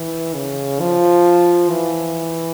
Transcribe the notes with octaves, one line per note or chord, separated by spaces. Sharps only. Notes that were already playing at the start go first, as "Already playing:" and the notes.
Already playing: E3
C#3
F3
E3